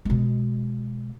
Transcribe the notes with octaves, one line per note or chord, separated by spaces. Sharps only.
B2 G#3